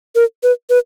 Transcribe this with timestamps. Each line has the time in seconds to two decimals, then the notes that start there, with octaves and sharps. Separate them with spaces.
0.15 A#4
0.43 B4
0.70 B4